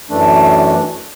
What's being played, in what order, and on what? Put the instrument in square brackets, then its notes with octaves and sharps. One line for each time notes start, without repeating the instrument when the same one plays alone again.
[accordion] F#2 E3 A3 D4